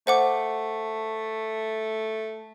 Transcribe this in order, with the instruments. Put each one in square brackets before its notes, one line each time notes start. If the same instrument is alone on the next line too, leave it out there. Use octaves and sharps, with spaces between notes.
[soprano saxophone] A3 [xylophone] C5 F#5 D6